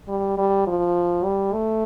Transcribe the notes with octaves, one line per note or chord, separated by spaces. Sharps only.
G3
G3
F3
G3
A3